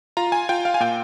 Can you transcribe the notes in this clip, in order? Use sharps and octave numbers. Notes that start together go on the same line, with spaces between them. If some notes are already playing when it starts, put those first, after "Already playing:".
F4 A#5
G#5
F4 G5
F5
G#5
A#2 G5